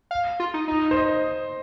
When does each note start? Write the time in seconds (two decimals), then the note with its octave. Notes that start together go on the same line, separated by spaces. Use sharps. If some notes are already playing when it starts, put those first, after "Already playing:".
0.11 F5
0.40 F4
0.54 D#4
0.68 D#4
0.91 C5
0.97 D#5